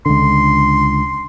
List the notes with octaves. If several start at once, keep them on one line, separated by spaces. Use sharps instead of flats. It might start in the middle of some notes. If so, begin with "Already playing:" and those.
C#2 D3 C6